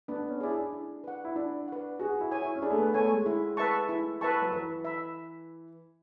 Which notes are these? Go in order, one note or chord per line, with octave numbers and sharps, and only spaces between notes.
B3 D4
C#4
E4 G#4 D5
D4
E4
B4 F#5
E4
D4 E4
B4 F#5
F#4 G#4
E4
C#5 G#5
E4
C#4
D4 G#4
A3
B3
A3 C#5 G#5
G#3
E4
B4 E5 A5 C#6
E4
B4 E5 A5 C#6
F#3
E3 B4
E5 B5